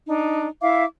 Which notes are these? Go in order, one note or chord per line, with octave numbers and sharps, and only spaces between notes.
D4 D#4
E4 E5 F5 D6